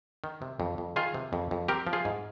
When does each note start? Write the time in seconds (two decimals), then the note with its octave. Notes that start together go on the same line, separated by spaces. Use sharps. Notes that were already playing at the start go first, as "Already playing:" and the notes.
0.24 D#3
0.42 C3
0.60 F2
0.78 F2
0.96 D#3 F4 G#4
1.14 C3
1.33 F2
1.51 F2
1.68 C4 G4 A#4
1.87 F3
1.93 F4 G#4
2.05 G#2